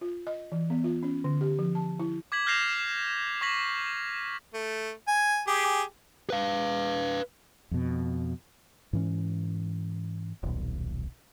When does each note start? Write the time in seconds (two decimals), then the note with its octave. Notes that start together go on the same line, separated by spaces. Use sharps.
0.01 F4
0.27 D#5
0.52 E3
0.70 B3
0.84 F4
1.03 C#4
1.24 D3
1.41 G4
1.59 F3
1.75 A5
1.99 E4
2.32 D6 G#6 B6 F#7
2.46 F6 G6 A#6 C7 E7 F7
3.41 C#6 D6 A#6 B6 F#7
4.54 A3
5.08 G#5
5.48 G4 G#4
6.30 B4 F5
7.71 F2 B2
8.93 G#2 E3 C#4
10.43 D#1 B1